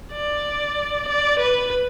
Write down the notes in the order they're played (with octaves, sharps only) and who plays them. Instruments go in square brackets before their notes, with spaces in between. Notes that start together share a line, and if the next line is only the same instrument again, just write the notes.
[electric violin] D5
D5
B4